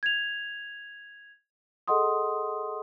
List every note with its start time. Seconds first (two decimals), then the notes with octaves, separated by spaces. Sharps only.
0.03 G#6 F7
1.88 G#4 A4 D#5 F#5 C6 D#6